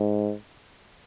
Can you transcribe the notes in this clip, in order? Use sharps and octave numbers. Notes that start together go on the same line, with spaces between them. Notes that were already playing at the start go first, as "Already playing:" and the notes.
Already playing: G#2